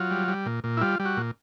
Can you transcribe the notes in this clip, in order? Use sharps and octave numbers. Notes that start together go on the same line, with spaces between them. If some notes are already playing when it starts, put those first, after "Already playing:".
Already playing: F#3 F4
G3
G3
A#2
A#2
E4
G3 F4
G3
F#4
A#2